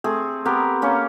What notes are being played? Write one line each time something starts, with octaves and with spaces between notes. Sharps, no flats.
A3 C4 G#4
B3 C4 G4 A#4
A#3 C#4